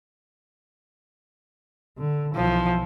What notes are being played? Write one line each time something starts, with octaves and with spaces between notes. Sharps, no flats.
D3
B1 E3 F3